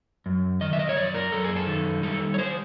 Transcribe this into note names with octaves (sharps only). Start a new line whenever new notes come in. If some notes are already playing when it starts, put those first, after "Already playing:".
F#2
D#3 D#5
E5
D#5
C#5
F#2 D5
A#4
F#2 A4
G#4
A4
D#3
G3 A4
C#5
G3 C5